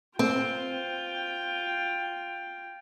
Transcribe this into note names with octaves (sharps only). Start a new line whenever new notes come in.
C4 F4 G5